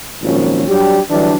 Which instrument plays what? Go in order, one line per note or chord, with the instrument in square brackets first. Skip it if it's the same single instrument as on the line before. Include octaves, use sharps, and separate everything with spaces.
[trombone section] G#1 D#2 A#2 F3 F#3 C#4
F#3 G3 D4 G4
D3 E3 F#3 G3 D4